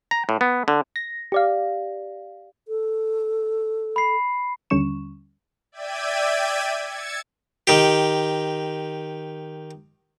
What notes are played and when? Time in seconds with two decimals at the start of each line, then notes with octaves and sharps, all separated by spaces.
0.11 A#5
0.29 A2
0.41 B3
0.68 D3
0.96 A#6
1.32 G4 D5 F5
2.68 A4
3.96 B5 C7
4.70 D#2 D3 G3 C#4 C#6 E7
5.72 D5 E5 G5 G#6 D#7
6.84 E6 G#6 A6 C#7
7.67 D#3 G4